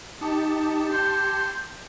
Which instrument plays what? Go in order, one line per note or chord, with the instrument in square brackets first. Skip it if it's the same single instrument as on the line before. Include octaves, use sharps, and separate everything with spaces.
[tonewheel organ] D#4 [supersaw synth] G4 A5 C#7
[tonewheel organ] C6 [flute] G6